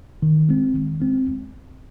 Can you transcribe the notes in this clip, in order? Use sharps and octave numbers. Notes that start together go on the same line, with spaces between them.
D#3
G#3 C4
D#3
G#3 C4